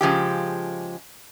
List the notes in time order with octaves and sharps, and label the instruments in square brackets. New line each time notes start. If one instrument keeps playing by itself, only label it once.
[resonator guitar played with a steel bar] C#3 F3 G#3 G4